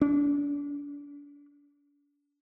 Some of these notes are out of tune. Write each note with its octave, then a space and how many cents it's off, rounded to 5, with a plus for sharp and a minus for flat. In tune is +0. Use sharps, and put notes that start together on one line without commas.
D4 -35